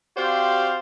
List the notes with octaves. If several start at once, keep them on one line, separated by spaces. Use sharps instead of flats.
C4 F#4 G4 C5 D5 F5